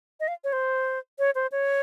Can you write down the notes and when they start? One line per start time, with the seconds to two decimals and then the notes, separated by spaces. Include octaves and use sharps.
0.20 D#5
0.28 F5
0.44 C#5
0.53 C5
1.19 C#5
1.35 C5
1.52 C#5